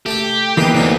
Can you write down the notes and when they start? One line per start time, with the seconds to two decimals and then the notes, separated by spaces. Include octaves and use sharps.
0.06 A3 G4 A4 D6
0.57 E3 A#3 B3 D#4 G#4 B4
0.74 D2 F#3 D#4 E4